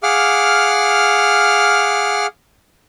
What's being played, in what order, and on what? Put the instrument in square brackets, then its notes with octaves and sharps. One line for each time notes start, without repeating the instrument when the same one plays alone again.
[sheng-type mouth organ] G#4 F5 F#5 D6 F6